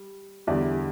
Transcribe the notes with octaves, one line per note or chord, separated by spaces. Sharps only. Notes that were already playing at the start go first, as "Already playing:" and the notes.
Already playing: G3
E2 D3 G3 D5